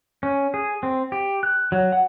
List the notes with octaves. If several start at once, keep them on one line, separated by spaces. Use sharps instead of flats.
C#4
G#4
C4
G4
F#6
F#3
F#5